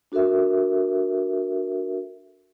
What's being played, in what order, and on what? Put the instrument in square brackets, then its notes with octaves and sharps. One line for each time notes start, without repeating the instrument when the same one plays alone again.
[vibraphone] D4 F#4 A4 A#4 E5